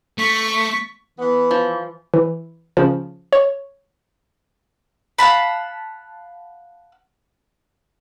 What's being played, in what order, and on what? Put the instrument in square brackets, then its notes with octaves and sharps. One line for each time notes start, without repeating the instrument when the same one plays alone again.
[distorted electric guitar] A3 [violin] C#6 B6
[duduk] E3 [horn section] B3
[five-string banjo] F3
[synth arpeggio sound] E3
C#3 F3
C#5
[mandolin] F5 F#5 A5 B5